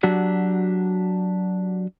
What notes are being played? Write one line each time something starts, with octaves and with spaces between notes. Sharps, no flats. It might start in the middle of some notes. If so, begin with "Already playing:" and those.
F#3 D4 F#4 G4